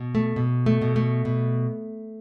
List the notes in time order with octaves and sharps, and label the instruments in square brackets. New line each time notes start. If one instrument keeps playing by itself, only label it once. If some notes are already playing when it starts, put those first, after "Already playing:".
Already playing: [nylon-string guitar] B2
A3
B2
A3
B2
A3
B2